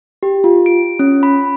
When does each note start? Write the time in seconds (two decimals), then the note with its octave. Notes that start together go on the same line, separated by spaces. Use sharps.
0.23 G4
0.44 F4
0.66 D7
0.99 C#4
1.23 B5